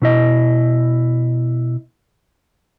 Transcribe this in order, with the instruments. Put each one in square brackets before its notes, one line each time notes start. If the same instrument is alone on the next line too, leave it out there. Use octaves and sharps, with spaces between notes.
[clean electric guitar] B2 E4 D#5